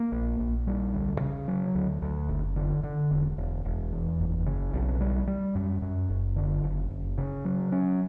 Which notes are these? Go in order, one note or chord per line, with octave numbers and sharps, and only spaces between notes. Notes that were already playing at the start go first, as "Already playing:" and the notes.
Already playing: A#3
A#1
A#1
G3
D2
C#3
F#3
D2
D2
F#1
D3
D3
E1
E1
E1
E2
F#1
C#3
B1
G3
G3
F#2
F#2
F#1
D3
F#1
F#1
C#3
F#3
C#4